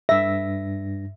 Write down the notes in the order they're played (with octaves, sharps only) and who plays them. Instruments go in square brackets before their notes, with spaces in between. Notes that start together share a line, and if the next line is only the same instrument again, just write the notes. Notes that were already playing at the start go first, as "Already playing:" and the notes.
[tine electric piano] G2 A#6 [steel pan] E5